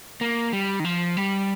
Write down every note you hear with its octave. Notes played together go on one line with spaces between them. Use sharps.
A#3
G3
D#3
F3
G3